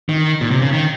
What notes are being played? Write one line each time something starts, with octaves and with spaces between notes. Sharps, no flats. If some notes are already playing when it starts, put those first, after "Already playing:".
D#3
A#2
C3
C#3
D#3